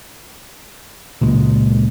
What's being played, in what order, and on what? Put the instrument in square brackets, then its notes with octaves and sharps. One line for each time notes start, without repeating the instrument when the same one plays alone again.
[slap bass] C#2 A#2 G#3